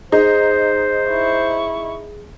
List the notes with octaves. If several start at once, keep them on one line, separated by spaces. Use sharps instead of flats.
D#4 G#4 C5
E4 C#6